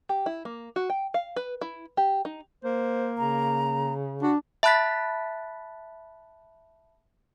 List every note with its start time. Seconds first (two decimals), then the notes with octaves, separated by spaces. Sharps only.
0.09 G4
0.26 E4
0.45 A#3
0.76 F#4
0.90 G5
1.14 F5
1.36 B4
1.61 E4
1.97 G4
2.25 D#4
2.64 A#3 C5
3.18 C#3 A#5
4.22 D4 F#4
4.63 E5 A5 B5 F#6 A6 B6